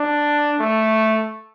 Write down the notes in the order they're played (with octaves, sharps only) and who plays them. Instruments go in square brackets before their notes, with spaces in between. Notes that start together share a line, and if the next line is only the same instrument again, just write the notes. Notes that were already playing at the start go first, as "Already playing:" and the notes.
Already playing: [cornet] D4
A3